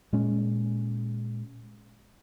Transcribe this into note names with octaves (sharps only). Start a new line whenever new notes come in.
A#2 G#3 C#4